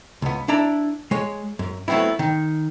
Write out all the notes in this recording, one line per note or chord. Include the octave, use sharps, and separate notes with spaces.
C#2 B3
D4 E4 D5 A#5
G#3 C#5
F#2
F#3 A3 B3 C4 E4
D#3